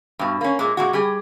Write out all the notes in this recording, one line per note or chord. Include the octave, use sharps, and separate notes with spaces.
G2 B2
A#3 C#4
A#2 G#3
A#2 G#3 F#4
G3 G4 G#4